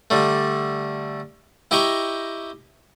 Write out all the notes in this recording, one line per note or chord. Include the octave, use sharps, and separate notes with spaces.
D3 G3 A3
E4 G4 D#5 G5 A#5 C#6